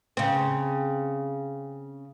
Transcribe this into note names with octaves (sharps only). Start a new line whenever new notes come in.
C#3 C4